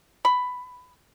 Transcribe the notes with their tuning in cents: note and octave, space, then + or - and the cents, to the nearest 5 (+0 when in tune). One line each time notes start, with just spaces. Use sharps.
B5 +10